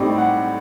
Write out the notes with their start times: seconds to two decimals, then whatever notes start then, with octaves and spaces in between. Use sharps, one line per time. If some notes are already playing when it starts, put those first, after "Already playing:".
Already playing: A2 G3 C4 D#4 D5
0.18 F#5